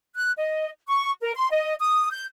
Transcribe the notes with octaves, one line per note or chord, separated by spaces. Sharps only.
F#6
D#5
C#6
A#4
C6
D#5
D#6
G6